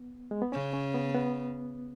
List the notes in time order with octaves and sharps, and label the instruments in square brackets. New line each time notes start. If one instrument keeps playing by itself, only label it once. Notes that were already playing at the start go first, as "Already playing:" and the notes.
Already playing: [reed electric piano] B3
G#3
B3
[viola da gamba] C#3 [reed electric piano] C#4
[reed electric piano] C#4
B3
B3